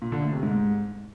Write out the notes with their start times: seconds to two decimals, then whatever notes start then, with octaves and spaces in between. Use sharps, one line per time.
0.02 A#2
0.12 D3
0.22 A3
0.33 C3
0.43 G#2